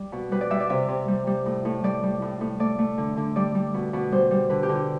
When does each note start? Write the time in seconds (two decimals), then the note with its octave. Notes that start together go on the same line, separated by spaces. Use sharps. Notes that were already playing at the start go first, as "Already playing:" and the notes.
Already playing: G3 D5
0.12 B2
0.31 G3 B4
0.41 D5
0.50 G3 E5
0.60 D5
0.69 C3 E5
0.88 C3
1.08 G3
1.27 G3
1.46 A2
1.65 A2
1.83 G3 D5
2.03 G3
2.22 A2
2.41 A2
2.59 A3 D5
2.79 A3
2.98 D3
3.17 D3
3.36 G3 D5
3.55 G3
3.74 B2
3.93 B2
4.12 G3 C5
4.31 G3
4.50 D3 B4
4.63 G4
4.69 D3
4.75 G4